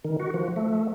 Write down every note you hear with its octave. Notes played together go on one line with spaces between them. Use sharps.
D#3
F#4
F3
A3